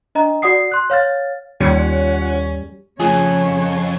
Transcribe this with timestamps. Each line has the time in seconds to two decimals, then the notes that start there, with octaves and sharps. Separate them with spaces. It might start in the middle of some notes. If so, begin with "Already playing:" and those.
0.15 D4 D#5 A#5
0.42 F#4 D5 F#5 D#6 C7
0.72 C6 F#6
0.90 C#5 F5 F6 A6
1.61 D#2 G3 C#4 F4 C#5 F#5
3.00 F2 C#3 A3 F4 G#4 C#5